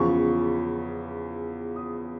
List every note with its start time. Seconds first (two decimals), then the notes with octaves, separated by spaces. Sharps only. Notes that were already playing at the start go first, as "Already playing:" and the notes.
Already playing: E2 C#3 F3 C#6
1.76 D#6